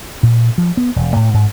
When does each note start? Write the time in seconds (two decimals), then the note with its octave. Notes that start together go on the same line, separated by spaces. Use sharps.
0.23 A#2
0.58 F3
0.77 B3
0.96 E1
1.16 A2
1.34 G#2